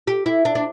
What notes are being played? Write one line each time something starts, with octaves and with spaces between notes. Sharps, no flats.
G4
E4
D4
D4